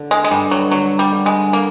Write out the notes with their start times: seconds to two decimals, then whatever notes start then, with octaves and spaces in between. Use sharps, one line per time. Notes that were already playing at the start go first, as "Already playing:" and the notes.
Already playing: D3
0.11 G#3
0.24 G#3
0.31 G2 G3
0.51 F#3
0.72 D3 F#3
0.99 G3
1.12 D3
1.26 G#3
1.53 A#3